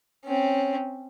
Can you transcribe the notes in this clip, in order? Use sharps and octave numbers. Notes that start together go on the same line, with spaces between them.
C4 C#4